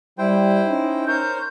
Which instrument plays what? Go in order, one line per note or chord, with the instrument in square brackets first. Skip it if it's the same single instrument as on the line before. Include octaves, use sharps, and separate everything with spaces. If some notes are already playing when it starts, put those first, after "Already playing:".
[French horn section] G3 [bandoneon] E4 C5 G5
[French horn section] C#4 D#4
[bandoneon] A#4 C5 C#5 [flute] G6